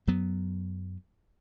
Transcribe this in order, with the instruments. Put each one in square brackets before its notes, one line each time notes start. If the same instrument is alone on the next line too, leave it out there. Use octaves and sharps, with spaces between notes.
[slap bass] F#2 F#3 B3